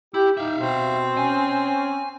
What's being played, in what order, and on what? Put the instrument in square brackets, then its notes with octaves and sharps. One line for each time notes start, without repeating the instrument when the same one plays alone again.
[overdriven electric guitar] E4 [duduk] G4
[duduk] D#4 [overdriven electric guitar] E5 F5
[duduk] B2 [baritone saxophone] C4
[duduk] C#4 [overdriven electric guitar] G#5